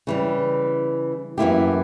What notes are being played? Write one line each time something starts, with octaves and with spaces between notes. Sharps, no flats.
C#3 E3 G3
F#2 E3 A#3 E4 G4